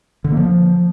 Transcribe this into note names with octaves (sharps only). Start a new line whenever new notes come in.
D3
A#3
F3